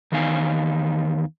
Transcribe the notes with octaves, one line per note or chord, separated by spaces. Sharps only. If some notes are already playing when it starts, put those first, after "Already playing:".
E2 D#3 B3 D#4 F5 G#5